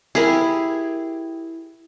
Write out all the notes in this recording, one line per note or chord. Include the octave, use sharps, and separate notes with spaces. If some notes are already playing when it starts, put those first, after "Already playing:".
E4 G4 G#4 A#4